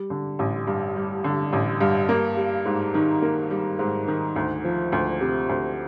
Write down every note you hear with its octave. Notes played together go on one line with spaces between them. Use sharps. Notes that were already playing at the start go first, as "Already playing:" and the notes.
Already playing: G3
D3
A1
G2
G3
D3
A1
G2
A#3
G3
G#2
D#3
A#3
G3
G#2
D#3
D2
F3
D2
C3
D2